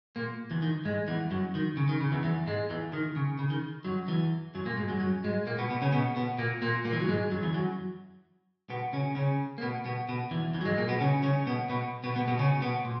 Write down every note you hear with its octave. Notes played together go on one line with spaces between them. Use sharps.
A#2 A#3
E2 E3
D#3
G#2 G#3
E2 E3
F#2 F#3
D#3
C#3
D#3
C#3
E2 E3
E2 E3
G#2 G#3
E2 E3
D#3
C#3
C#3
D#3
F#2 F#3
E2 E3
F#2 F#3
A#2 A#3
G#2 G#3
F#2 F#3
F#2 F#3
G#2 G#3
A#2 A#3
B2 B3
B2 B3
C#3 C#4
B2 B3
B2 B3
A#2 A#3
A#2 A#3
A#2 A#3
E3
F#3
G#2 G#3
F#2 F#3
E2 E3
F#2 F#3
B2 B3
C#3 C#4
C#3 C#4
A#3
B2 B3
B2 B3
B2 B3
E2 E3
E2 E3
F#3
G#2 G#3
A#2 A#3
B2 B3
C#3 C#4
C#3 C#4
B2 B3
B2 B3
B2 B3
B2 B3
B2 B3
C#3 C#4
B2 B3
A#2